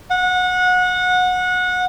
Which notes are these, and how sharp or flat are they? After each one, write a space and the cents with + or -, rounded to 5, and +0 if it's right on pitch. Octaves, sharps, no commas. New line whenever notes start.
F#5 -25